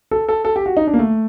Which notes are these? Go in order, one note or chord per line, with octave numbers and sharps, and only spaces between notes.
A4
A4
A4
G4
F#4
D#4
D4
A#3
A3